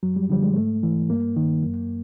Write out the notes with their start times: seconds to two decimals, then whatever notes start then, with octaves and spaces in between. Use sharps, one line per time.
0.03 F#2 F#3
0.16 G3
0.30 D3 F3 G3
0.43 G#3
0.56 G#2 A3
0.83 E3
1.09 G2 A#3
1.37 D#3
1.63 F#2